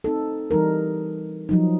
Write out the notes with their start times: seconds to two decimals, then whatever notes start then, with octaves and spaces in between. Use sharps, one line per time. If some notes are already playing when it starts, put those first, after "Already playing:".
0.04 C4 D#4 A4
0.51 E3 G3 D#4 A#4
1.49 F3 F#3 D#4